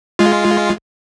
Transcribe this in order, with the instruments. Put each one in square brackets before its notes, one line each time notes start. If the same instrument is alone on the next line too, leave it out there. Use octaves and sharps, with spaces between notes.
[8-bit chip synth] G#3 F4